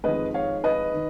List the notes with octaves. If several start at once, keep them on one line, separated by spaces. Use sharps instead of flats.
F2 D#3 G#3 B4 D#5
C#5 F5
B4 D#5
D#3